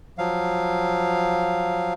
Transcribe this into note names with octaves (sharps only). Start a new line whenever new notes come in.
F3 F#3 F5